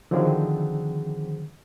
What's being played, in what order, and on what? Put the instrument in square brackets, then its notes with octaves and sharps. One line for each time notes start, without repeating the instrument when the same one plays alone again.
[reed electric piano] D3 D#3 F3 F#3 C4 G#4